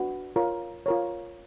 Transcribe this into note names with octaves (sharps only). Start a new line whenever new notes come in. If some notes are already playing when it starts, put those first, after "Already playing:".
Already playing: D4 F#4 B4
F4 A#4 C#5
F4 A#4 C#5